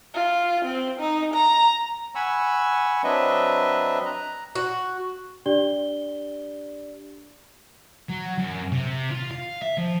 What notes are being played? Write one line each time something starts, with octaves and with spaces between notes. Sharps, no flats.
F4
C4
D#4
A#5
F#5 G#5 B5 C#6 E6
F#3 C4 D4 B4 D#5 E5
A#5 F#6
F#4
D4 G4 D5 G7
F#3
F#2
C3
F4
F5
E5
F3